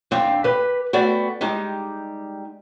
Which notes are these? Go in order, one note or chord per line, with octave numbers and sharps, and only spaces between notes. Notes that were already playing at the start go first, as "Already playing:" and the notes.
D#2 C4 D4 F5 G5
G4 B4
A3 B3 F#4 D5 G5
G3 G#3 D#4 G4